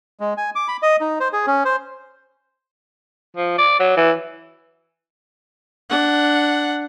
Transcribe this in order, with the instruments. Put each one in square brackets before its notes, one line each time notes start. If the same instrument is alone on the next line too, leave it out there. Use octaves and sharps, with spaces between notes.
[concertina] G#3
G#5
D6
B5
D#5
D#4
C5
G#4
C#4
C5
[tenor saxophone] F3
D5
F#3
E3
[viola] D4 F#5